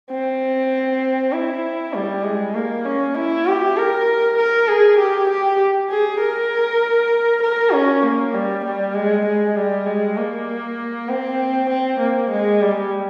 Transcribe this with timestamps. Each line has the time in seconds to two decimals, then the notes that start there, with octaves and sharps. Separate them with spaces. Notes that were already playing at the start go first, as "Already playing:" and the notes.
0.11 C4
1.33 E4
1.94 G3
2.24 G#3
2.55 A#3
2.86 C#4
3.16 E4
3.47 G4
3.77 A#4
4.38 A#4
4.68 G#4
4.99 G4
5.30 G4
5.90 G#4
6.21 A#4
7.43 A#4
7.73 C#4
8.04 A#3
8.34 G3
8.65 G3
8.95 G#3
9.26 G#3
9.57 G3
9.86 G#3
10.17 A#3
11.09 C4
11.70 C4
12.00 A#3
12.31 G#3
12.61 G3